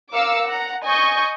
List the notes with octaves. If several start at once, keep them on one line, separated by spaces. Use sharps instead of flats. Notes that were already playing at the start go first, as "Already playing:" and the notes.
A#4 F5 D6 E6 C#7
F#5 A#5
D#5 G#5 C#6 G6